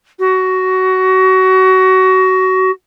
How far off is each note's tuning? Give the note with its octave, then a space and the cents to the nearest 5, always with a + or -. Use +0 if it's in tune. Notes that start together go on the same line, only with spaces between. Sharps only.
F#4 +20